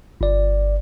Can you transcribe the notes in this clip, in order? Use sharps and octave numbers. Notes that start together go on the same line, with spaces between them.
G1 D5